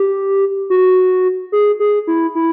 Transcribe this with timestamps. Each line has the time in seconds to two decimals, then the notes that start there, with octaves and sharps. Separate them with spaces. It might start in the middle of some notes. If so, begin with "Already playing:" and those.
Already playing: G4
0.70 F#4
1.52 G#4
1.80 G#4
2.07 E4
2.35 E4